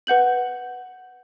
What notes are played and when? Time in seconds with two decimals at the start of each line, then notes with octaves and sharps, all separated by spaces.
0.07 B4 F#5 G6 F#7